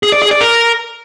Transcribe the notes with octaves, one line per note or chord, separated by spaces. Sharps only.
G#4
D5
G#4
D5
A#4